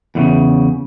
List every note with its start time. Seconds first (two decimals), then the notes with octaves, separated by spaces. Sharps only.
0.15 E2 A2 C#3